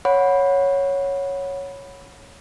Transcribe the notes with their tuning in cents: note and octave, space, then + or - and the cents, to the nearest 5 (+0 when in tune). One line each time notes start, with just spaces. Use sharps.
C#5 +0 F#5 -15 B5 +0